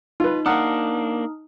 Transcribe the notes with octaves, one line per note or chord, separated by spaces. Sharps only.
D#4 F4 B4
A#3 D4 F#5 A#5 D#6 F6